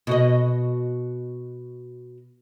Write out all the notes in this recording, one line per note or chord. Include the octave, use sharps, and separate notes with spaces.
B2 F#4 D#5